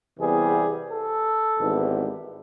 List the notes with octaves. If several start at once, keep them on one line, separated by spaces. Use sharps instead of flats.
E2 C3 E3 G3 B3 G#4
A4
G#1 G#2 E3 G3 B3